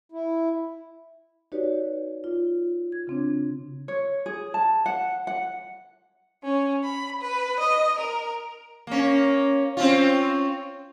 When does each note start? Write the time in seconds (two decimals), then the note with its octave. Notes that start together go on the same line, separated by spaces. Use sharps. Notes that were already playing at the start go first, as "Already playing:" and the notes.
0.12 E4
1.52 D#4 F#4 G4 B4 C#5 D5
2.24 F4
2.92 G#6
3.07 C#3 C4 D4
3.88 C#5
4.26 G#4
4.54 A5
4.86 F#5
5.27 F#5
6.44 C#4
6.84 B5
7.22 B4
7.61 D#5
7.99 A#4
8.87 A#3 C#4
9.77 C4 C#4 F4